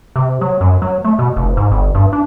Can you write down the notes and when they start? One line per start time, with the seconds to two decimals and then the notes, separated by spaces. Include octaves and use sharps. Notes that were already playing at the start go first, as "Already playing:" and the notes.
0.16 C3
0.41 F#3
0.61 F#2
0.82 F#3
1.05 A3
1.19 B2
1.36 F1
1.57 G#2
1.71 G1
1.95 G2
2.13 D4